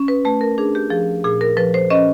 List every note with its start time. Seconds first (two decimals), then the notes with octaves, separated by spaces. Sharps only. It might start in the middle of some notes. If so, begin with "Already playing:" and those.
Already playing: C#4
0.08 B4
0.25 A3 B4
0.41 A#4
0.58 D4 G#4
0.75 G4
0.90 F3 G#4
1.24 A#2 G#4
1.41 A#4
1.57 F3 B4
1.74 C5
1.90 C#4 D#5